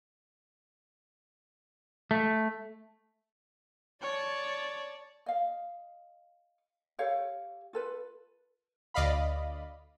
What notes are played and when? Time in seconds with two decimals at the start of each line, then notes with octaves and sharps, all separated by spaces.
2.11 A3
4.02 C#5 D5 A5
5.26 D#5 F5
6.99 G4 A4 C#5 F5
7.73 F4 A4 B4
8.94 D2 D5 D#5 F5 B5